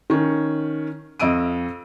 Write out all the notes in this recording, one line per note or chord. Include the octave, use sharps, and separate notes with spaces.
D#3 C#4
F2 D#5 E6 D7 D#7